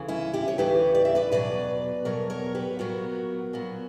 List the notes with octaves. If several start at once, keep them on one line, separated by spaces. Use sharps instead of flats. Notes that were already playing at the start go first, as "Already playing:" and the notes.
Already playing: D2 C#3 E3
C#4 E4
E4 G4
C#5
D2 C#3 E3 G4 B4
D5
E5
B4 D5
E2 B2 F#3 B4 D5
E2 B2 F#3 A#4 C#5
A#4 C#5
G4 B4
A#2 F#3 B3 F#4 A#4
A#2 F#3 B3